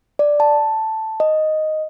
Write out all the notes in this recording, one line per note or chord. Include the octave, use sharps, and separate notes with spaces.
D5
A5
D#5